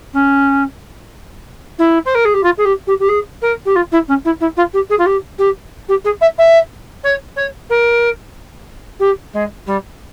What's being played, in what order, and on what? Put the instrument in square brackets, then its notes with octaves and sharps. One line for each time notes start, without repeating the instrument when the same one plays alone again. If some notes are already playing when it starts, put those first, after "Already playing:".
[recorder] C#4
E4
C5
A#4
G#4
G4
F4
G#4
G4
G4
G4
G#4
A#4
G4
F4
E4
C#4
E4
E4
F4
G4
G#4
F4
G4
G4
G4
G#4
E5
E5
C#5
C#5
A#4
G4
G#3
G3